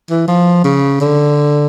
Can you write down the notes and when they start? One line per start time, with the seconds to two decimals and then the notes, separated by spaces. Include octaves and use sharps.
0.10 E3
0.28 F3
0.64 C#3
1.01 D3